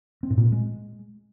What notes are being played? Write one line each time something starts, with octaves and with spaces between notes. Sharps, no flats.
C4
A2
A#2
C4
G#3